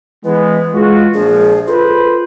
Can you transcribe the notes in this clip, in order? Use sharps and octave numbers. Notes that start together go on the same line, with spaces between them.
E3 G#3 B3 B4
G#3 F4 F#4
A#1 F3 G#4
F4 A4 B4 C5